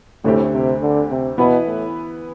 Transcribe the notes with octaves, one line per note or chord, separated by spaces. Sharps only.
D2 A2 D3 A3 C4 G4
C3
D3
C3
B2 E3 B3 E4 B4
A2